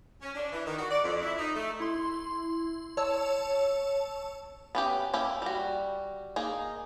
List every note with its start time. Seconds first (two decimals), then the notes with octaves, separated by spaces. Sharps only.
0.22 C#4
0.35 D4
0.52 E3
0.66 D#3
0.79 F#4
0.90 D5
1.03 F2
1.22 E4
1.39 D#4
1.56 A3
1.80 E4 C6
2.97 C#5 A5 E6
4.75 B3 C#4 G4
5.13 A#3 C#4 E4 G4
5.42 G3 F#4
6.36 A#3 D#4 G#4